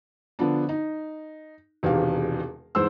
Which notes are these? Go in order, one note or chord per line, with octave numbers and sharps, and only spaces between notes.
D3 F3 B3 D4
D#4
E1 E2 C3 D#3 E3 F5
E2 G#2 C5 C6 E6